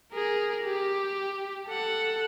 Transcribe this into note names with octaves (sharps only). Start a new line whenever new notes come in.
G#4 A#4
G4
A4 F#5